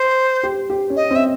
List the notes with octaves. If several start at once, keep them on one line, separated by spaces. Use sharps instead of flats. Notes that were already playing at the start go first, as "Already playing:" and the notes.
Already playing: C5
G4
G4
C#4
D#5
C4
E5